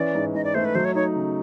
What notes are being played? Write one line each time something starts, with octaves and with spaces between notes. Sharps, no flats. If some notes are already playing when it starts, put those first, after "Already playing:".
Already playing: E3 C#4 D5
G#2
G#2 D#5
D5
A3 C5
B4
F#3 C5
C#5
D#4 C#5
C#3